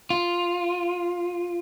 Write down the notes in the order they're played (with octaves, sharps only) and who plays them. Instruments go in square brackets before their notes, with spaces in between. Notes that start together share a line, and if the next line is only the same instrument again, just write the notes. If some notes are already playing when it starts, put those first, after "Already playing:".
[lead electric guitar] F4